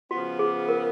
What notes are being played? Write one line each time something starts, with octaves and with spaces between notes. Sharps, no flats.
C#3 F3 B3 F#4
G#4
A#4